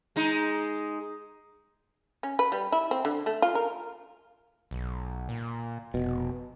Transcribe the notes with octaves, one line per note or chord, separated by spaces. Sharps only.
G#3 D#4
C#4
B4
G3
E4
C4
D3
A3
F4
A#4
B1
A#2
F1 B2